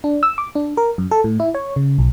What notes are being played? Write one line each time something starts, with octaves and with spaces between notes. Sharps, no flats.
D4
E6
D6
D4
A#4
F#2
A4
A2
E4
C#5
C#3
B1